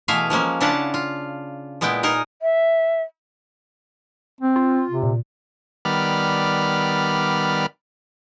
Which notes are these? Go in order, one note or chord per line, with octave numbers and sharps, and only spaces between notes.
B2 E3 A3 G#4 E5 F5
F3 G#3 A#3 C#4
C#3 D4 E4 F4 F#5 A5
F4
A#2 G#3 B3 E4 G5
D#4 G#4 A#4 D#5
E5
C4
F4
C3
A#2
D#3 G3 B3 D5 B5 F6